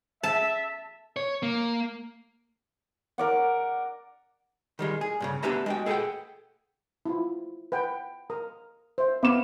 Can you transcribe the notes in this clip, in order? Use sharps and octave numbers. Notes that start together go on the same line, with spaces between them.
E5 A5
C#5
A#3
A#4 D5 F#5
D#3 G3 G#3
G#4
G2 A#2 C#3
B3 D4 G4 B4 E5 A#5
G#3 F#4 G5
G#4 A4 B4 C5 F#5 G5
E4 F4
B4 F#5 G5
A#4 A#5 D#6
C5 E5
B3 E5 F5 B5 D6 E7